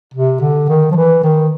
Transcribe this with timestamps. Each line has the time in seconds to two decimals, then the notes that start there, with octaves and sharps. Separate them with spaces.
0.14 C3
0.40 D3
0.69 D#3
0.91 F3
0.96 E3
1.23 D#3